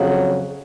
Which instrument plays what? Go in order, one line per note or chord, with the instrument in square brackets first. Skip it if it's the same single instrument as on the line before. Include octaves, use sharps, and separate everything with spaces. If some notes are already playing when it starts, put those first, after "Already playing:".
Already playing: [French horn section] F2 C#3 F#3